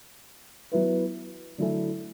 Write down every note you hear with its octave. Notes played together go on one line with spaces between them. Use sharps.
F#3 B3 E4 B4
D3 F#3 A3 E4 A4